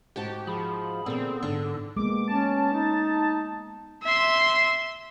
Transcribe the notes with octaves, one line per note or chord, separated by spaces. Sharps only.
G#2 F#4 G4 A5
F3 G#4 B5
A#2 D3 B3 C4 G#4 A4
G#2 D3 D4 A4
G#3 A#3 B3 D6
C#4 A5
D#4
E5 C6